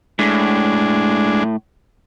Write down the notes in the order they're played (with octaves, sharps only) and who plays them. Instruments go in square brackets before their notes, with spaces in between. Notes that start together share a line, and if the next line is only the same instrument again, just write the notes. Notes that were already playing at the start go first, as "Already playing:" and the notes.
[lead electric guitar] A2 [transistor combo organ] G#3 D4